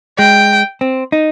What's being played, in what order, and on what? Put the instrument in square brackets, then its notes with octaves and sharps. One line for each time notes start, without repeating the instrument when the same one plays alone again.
[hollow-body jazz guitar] G#3 [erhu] G5
[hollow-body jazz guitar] C4
D#4